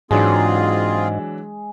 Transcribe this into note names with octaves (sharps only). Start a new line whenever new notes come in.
G#2 E3 F#3 G#3 C4 D4 F4 G#4